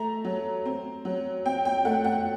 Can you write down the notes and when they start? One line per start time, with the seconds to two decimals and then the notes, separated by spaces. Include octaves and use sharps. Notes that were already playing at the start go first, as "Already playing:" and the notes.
Already playing: A3 A#5
0.25 F#3
0.66 C4
1.05 F#3
1.45 C4 G5
1.65 G5
1.85 A3 F#5
2.04 F#5